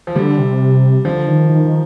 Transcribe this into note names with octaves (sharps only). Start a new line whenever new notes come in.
F3
D3 G3
C3
D3 F3
D#3
D#3
D#3